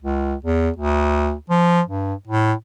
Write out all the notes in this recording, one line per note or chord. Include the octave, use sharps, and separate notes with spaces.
C#2
E2
D2
F3
G2
A2